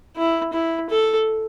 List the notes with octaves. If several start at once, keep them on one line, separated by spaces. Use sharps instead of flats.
E4
E4
A4